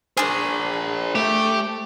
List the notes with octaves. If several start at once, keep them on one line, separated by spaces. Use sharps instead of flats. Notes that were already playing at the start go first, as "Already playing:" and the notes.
D4 G#4 A#4 C5
A3 G4